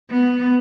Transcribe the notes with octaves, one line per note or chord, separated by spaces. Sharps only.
B3